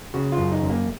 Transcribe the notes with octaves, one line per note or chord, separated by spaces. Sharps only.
C#3 F#4
F4
F#2
D#4
F#2
A#3